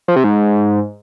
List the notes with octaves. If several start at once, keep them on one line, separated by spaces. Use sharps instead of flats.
F3
C3
G#2